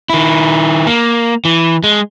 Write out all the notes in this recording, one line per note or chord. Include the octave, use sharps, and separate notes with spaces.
D#3 E4
A#3
E3
G#3